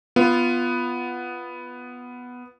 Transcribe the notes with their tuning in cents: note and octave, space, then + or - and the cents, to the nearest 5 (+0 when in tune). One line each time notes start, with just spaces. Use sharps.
B3 +0 F4 -15